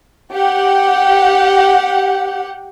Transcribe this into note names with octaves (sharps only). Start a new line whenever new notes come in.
G4 F#5